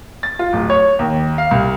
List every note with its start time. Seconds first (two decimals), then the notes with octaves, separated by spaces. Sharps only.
0.23 A6
0.39 F4
0.53 D1
0.70 C#5
0.99 D#2
1.38 F5
1.51 C2